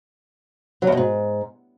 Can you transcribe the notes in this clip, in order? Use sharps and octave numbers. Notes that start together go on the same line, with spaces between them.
F#3
E2
B2
G#2